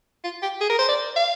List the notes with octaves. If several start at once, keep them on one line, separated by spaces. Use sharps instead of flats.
F4
G4
G#4
A#4
C5
D5
F5